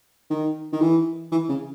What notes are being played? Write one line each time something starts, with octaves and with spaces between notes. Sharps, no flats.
D#3
D#3
E3
E3
C#3